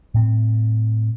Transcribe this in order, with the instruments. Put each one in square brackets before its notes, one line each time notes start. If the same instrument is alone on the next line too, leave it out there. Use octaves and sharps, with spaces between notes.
[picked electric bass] A2 C4